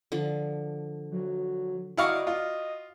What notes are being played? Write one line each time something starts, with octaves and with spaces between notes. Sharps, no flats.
D3 F3
F#3
E4 F#4 D5 D#5 F5 A#5 C#6
F4